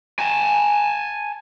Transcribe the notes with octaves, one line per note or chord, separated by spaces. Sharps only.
G#5 A5